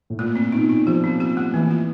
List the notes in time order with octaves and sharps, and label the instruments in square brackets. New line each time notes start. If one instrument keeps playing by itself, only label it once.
[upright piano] A2
[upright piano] A#2 [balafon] A3
[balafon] C4
[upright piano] B2 [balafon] D#4
[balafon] D#4
[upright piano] F3 [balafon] G4
[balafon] C4
G4
A3
[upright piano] E3 [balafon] A#3
[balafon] F4